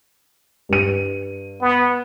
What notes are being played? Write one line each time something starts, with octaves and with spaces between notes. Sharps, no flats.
G2 D#7
B3